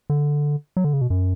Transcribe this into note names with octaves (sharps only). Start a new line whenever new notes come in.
D3
F#3
D3
C#3
B2
F#2